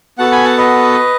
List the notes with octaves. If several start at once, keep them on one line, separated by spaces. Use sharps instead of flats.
B3 F#4 A4 F#5 A5
G#5 B5
F#5 A5
B4 D#5